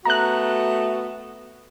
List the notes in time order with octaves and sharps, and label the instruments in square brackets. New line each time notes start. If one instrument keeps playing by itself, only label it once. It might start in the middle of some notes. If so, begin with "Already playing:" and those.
[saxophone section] A3 B3 F#4 [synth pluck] A#5 F#6